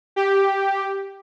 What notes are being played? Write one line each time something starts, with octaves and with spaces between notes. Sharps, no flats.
G4